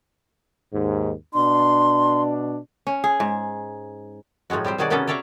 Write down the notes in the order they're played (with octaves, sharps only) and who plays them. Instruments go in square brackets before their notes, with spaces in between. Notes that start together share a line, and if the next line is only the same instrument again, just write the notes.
[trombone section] D#2 G#2
[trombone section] B2 D4 [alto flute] C6
[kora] C#4
G#4
G#2
[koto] A2 F3 F#3 G#3 F#4
G3 C4 G4 C5
B2 D#3 F#3 F#4 G#4 D5
C3 A#3 B3 C#4 G#4 A4
A4 C#5 D5 E5 F5 A#5